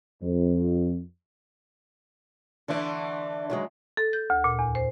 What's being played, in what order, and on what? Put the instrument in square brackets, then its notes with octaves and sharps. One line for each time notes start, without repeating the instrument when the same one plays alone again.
[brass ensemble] F2
[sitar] D3 E3 A3 [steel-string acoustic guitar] D4 D5
[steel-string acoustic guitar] D#3 F#3 G#3
[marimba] A4
G6
D2
A#2
E2
C5